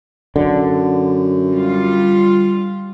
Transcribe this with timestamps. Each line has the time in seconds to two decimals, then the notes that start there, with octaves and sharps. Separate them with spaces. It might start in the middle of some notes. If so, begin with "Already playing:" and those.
0.36 F#2 D3
1.49 G3 F4